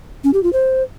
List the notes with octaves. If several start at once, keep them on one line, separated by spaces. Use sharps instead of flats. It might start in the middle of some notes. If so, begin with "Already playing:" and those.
C#4
G4
F4
C5